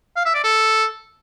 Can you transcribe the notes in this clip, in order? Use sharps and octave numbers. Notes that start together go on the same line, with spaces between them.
F5
E5
D5
A4